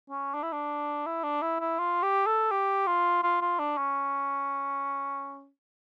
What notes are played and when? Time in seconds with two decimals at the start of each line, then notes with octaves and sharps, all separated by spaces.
0.10 C#4
0.34 D4
0.43 E4
0.53 D4
1.06 E4
1.24 D4
1.42 E4
1.60 E4
1.79 F4
2.03 G4
2.27 A4
2.51 G4
2.87 F4
3.23 F4
3.41 F4
3.59 D4
3.78 C#4